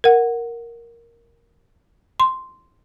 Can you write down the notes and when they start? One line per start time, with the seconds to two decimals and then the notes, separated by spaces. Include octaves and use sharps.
0.04 A#4 F#5
2.20 C6